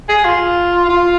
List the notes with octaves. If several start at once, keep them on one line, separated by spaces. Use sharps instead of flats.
G#4
F4
F4